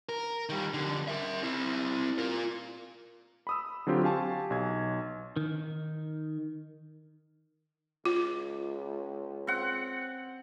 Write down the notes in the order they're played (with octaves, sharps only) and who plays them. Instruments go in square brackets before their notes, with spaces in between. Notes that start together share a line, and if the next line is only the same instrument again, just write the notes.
[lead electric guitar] A#4
D#3 G3
F2 D3
A#4 E5
C4 E4
F4 A#4
[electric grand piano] B5 D#6 E6
D3 F#3 C4 F4 G4
G4 F5 G#5 A5 C#6
B1 G#6
[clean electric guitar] D#3
[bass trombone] C#2 [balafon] F4
[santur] C4 F#5